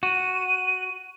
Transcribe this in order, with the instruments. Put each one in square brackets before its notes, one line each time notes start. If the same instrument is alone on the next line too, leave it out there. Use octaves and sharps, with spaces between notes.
[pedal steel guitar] F#4 [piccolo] D#7